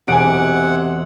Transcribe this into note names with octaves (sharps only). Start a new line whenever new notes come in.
E1 C3 F#5 G#5 D6 D7